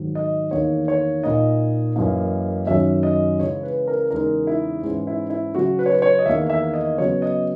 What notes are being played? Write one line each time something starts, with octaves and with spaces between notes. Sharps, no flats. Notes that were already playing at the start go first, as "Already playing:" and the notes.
Already playing: G#2 D#3 F#3
D#5
E2 D#3 A#3 D#4 C#5
C#5
A#2 A#3 D#4 D#5
F#2 E3 A#3
F#2 D#3 F#3 C#4 E5
D#5
C#3 E3 G#3 C#4 C#5
B4
A#4
E2 C#3 G#3 D#4 A#4
E4
G#2 E3 G#3 C#4
E4
E4
C#3 F#3 C#4 F#4
B4
C#5
B4
C#5
D#5
E2 D#3 A#3 E5
E5
D#5
C#3 F#3 B3 C#5
D#5